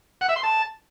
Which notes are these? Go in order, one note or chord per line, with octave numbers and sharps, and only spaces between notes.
F#5
E5
C6
A5